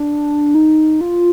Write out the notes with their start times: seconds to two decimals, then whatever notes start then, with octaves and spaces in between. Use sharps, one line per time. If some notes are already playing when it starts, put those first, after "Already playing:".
Already playing: D4
0.55 D#4
1.01 F4